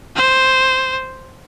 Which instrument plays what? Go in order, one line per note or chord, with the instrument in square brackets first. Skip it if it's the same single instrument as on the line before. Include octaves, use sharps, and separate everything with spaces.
[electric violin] C5